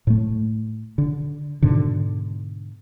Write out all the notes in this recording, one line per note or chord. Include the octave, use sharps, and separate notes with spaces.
A2 A3
D3
G#2 B2 D3